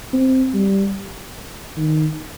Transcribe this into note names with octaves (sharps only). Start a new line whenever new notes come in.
C4
G3
D#3